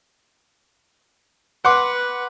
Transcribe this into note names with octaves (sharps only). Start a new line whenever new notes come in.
B4 F#5 C6 D6